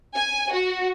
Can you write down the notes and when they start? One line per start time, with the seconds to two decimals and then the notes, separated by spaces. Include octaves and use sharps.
0.16 G#5
0.52 F#4